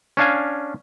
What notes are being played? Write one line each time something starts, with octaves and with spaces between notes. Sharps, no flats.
C#4 D4 F5 G#5